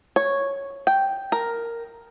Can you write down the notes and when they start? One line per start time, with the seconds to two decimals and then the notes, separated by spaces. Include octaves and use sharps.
0.16 C#5
0.87 G5
1.32 A#4